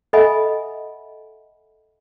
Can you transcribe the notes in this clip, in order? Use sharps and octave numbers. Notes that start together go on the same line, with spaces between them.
A4 D#5 E5 F#5 G#5 B5